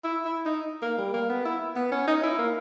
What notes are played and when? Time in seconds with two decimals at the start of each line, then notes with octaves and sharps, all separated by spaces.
0.04 E4
0.25 E4
0.45 D#4
0.82 A#3
0.98 G3
1.14 A#3
1.29 B3
1.45 E4
1.76 B3
1.91 C#4
2.07 D#4
2.23 E4
2.38 A#3